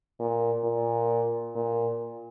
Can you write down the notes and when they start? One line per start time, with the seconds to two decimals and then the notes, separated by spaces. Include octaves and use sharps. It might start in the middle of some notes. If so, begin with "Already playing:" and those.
0.20 A#2
0.64 A#2
1.55 A#2